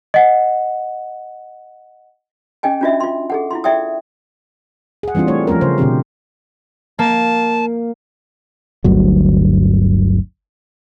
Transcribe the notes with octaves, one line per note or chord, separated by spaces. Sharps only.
D#5 F#5
C#4 G#4 D#5 G5 G#5
C#4 D4 F4 F#4 D#5 E5
F4 C6
G#4 A4 F#5
E4 F4 C6
E4 G#4 D5 E5 G5 D#6
G#4 F#5
E3 G3 C4 D4 F4
A3 C#5
F3 A3 C#4 A#4
C#3 C5
B2 D3 C4 G4
A#3 A5
G1 D2 G2 F#3